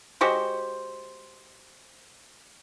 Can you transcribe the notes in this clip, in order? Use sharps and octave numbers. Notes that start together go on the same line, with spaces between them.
G#3 F#4 G4 C5